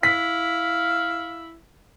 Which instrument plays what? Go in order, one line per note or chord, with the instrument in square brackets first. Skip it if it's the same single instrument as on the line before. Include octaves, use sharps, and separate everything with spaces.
[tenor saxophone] E4 [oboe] F5 [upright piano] B6